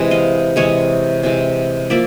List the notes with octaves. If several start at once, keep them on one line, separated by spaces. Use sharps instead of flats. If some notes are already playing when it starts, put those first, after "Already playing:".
Already playing: C3 E3 G#3
D#5 F5
C3 E3 G#3 C#5 D#5
C3 E3 G#3
F3 A#3 D5 E5